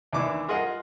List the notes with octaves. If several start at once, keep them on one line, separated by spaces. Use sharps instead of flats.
D#2 E3 D4 E4 D6
F4 G#4 A#4 D#5 F#5